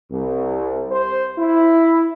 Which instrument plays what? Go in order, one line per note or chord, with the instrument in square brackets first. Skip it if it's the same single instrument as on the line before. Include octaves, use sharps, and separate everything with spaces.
[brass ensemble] C2
C5
E4